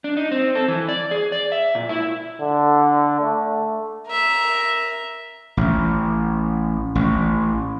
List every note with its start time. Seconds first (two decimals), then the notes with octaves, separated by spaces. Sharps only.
0.04 D4
0.17 D#4
0.31 C4
0.55 A4
0.68 E3
0.89 D5
1.11 G#4
1.32 D5
1.52 E5
1.75 A#2
1.89 E4
2.41 D3
3.21 A3
4.07 A#4 E5
5.57 A1
6.95 A1